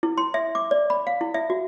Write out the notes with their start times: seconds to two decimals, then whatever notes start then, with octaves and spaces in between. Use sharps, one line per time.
0.03 E4
0.18 C6
0.34 E5
0.55 D6
0.71 D5
0.90 B5
1.07 F5
1.21 E4
1.34 E5
1.50 F#4